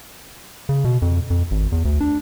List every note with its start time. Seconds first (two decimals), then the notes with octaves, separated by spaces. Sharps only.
0.69 C#3
0.85 B2
1.02 F2
1.30 F2
1.51 G#1
1.72 E2
1.85 D2
2.01 D4